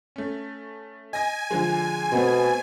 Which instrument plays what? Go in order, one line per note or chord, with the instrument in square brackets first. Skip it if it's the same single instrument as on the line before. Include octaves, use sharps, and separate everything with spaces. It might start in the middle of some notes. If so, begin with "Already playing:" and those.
[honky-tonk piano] A3 C#4
[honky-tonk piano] D#5 A#6 [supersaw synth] G#5
[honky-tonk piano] D3 F3 G#3
[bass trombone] B2 [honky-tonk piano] A3 B3 C4